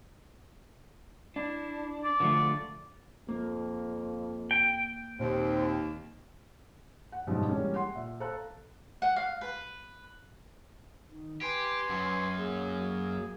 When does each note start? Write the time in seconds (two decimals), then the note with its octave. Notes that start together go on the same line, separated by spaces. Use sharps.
1.36 D4 E4
2.03 D5
2.20 D3 F3 A3
3.29 F2 A#3
4.51 G5
5.20 D#2 A#2 C4
7.12 F#5
7.27 G#1 F#2 B2 D#3 F3 G3
7.49 E3 G3 G#3 A#3 C#4 D4
7.75 F#5 C6
7.95 A#2 E5
8.20 A4 C5 F5 A#5 F#6
9.02 F#5
9.16 F5
9.41 B4
11.11 D#3
11.41 G4 B4 G#5 C6
11.89 F#2
12.37 A#3 G#4